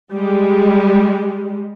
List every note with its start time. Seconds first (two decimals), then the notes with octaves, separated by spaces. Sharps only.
0.12 G3 G#3